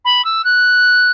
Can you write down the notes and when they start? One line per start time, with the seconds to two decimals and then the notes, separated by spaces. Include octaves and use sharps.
0.05 B5
0.24 E6
0.44 F#6